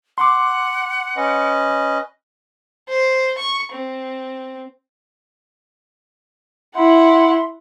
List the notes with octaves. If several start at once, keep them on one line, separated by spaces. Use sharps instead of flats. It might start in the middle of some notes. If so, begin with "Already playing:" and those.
F#5 C6 D6
C#4 B4 D#5
C5
C#6
C4
E4 E5 F#5 B5 C6